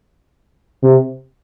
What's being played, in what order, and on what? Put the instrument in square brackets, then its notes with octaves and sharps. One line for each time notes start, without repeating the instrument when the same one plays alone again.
[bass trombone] C3